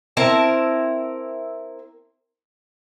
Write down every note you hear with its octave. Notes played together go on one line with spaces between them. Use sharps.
C4 E4 A#4 A5